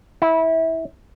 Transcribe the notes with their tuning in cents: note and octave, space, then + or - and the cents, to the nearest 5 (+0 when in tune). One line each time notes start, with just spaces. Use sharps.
E4 -20